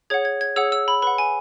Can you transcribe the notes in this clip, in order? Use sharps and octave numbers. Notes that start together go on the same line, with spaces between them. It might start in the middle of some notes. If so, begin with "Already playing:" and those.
G#4 C#5 F#5 G#6
G#6
G#6
G#4 C#5 F#5 E6
E6
B5
B4 F#5 B5
G#5